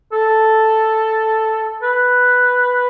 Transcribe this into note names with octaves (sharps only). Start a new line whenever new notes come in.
A4
B4